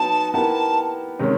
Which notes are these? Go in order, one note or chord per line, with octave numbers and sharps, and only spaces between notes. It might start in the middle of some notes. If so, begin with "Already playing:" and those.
Already playing: F#3 B3 D#4 A5
B3 E4 G4 A#4 A5
C3 D#3 G#3 C#4